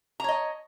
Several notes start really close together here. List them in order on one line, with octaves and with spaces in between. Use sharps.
A#5 C#5 D#5